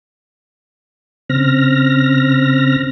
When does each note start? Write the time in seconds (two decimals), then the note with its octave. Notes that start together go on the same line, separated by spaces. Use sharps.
1.29 C#3 C4 F6 A#6